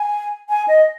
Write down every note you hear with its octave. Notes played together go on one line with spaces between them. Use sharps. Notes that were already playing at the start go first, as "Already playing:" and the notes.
Already playing: G#5
G#5
D#5